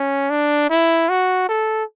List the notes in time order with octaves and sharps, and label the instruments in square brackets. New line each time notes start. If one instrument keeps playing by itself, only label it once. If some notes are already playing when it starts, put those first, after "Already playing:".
Already playing: [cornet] C#4
D4
E4
F#4
A4